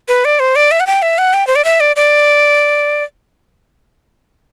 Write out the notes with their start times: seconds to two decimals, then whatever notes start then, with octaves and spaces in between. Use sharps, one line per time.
0.08 B4
0.25 D5
0.40 C5
0.56 D5
0.71 E5
0.80 F#5
0.87 G5
1.02 E5
1.18 F#5
1.34 G5
1.47 C5
1.56 D5
1.65 E5
1.80 D5
1.96 D5